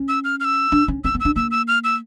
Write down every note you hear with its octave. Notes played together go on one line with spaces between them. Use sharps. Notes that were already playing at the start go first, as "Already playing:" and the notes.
Already playing: C#4
E6
F6
F6
E6
D4
C#4
C4 E6
B3
D4 E6
A#3 E6
E6
F6
E6